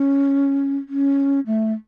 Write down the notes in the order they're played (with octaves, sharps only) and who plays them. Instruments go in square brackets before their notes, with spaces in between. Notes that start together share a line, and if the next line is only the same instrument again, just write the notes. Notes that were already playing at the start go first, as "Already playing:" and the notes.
Already playing: [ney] C#4
C#4
A3